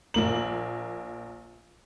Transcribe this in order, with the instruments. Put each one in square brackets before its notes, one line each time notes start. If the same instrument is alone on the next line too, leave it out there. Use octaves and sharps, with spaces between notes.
[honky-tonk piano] A#1 A#3 F#7